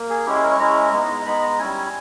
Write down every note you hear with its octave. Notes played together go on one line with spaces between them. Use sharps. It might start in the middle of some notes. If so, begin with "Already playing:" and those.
Already playing: A#3
G#4
G#3 C#4 E4 G4
G#4
A#4
C#5
G#3 C#4 E4 A#5
G#3 B3 D#4
G#3 B3 D#4 B5
A#5
G3 C#4 E4 G#5